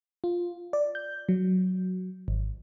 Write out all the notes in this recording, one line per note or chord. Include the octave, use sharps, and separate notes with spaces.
F4
D5
G6
F#3
G#1